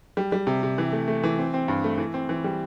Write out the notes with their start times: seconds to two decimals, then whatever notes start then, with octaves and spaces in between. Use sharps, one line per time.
0.17 G3
0.32 G3
0.47 C3
0.63 C3
0.78 E3
0.92 A3
1.08 A3
1.23 E3
1.38 C4
1.54 C4
1.68 G2
1.84 A3
1.98 E3
2.14 C4
2.29 E3
2.44 G3